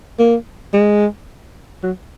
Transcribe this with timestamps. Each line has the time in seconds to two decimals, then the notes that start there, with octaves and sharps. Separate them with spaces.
0.19 A#3
0.73 G#3
1.83 F#3